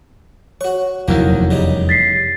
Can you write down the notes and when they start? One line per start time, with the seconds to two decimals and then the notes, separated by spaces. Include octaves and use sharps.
0.61 F#4 C#5 C#6
1.08 F1 E2 D#3 F#3 A#3 E4
1.51 C#3 G3 D#4
1.89 A6 B6 C7